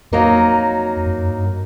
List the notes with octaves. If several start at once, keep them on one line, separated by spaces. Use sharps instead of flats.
F2 F#3 A#3 D#4
F#2
G2